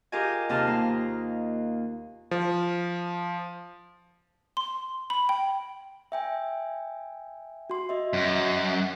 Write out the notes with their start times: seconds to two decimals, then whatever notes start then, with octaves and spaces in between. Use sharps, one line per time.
0.12 F4 G4 G#4 A#4 D#5 G#5
0.49 D#2 C3 D#5 A5 F6
0.67 A#3 F5
2.31 F3
4.57 C6
5.10 B5
5.29 G5
6.12 E5 G5 G#5
7.70 F#4 C6
7.89 F#4 D#5 E5
8.13 F#2